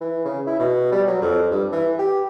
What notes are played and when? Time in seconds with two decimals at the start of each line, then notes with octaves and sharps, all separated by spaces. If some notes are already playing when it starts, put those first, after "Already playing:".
0.01 E3
0.25 C#3
0.46 E4
0.59 B2
0.92 G3
1.07 F#3
1.22 F2
1.51 G2
1.72 E3
1.99 G4